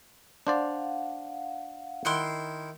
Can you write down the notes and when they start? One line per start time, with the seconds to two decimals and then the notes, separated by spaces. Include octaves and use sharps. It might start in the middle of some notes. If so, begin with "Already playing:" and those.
0.47 D4 C5 D5 F5 F#5
2.05 D#3 E4 C6 F#6